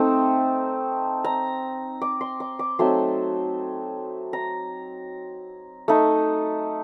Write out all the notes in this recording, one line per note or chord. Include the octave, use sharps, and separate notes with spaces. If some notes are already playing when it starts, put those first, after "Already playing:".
Already playing: A3 C4 D#4
A#5
D6
C6
D6
D6
F#3 A3 C4 D#4 C6
A#5
A3 D#4